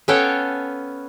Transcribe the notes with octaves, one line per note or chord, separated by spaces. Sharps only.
B3 C#4 A4 C#5 F5 G5